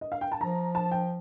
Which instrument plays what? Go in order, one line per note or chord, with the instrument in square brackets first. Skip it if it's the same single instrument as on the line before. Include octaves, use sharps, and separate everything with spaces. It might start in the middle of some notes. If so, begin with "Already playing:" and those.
[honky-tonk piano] D#5
F5
G5
A5
[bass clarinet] F3 [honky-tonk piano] A#5
[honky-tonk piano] A5
G5